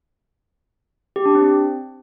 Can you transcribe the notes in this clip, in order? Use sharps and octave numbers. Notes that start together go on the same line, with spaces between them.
G4
D4
C4